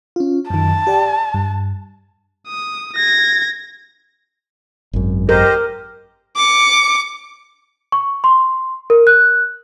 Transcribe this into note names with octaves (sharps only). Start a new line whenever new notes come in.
C#4 F4
F#2 D#3 A5
G4 D5 G5
G2
D#6
G#6 A#6
G#1 F#2
G4 A#4 C5 D#5
D6 C#7
C#6
C6
A#4
F#6